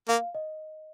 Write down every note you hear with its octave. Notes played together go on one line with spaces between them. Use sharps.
A#3 F5
D#5